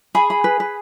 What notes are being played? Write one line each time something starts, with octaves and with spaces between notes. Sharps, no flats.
G#4 B5
B5
B4
B4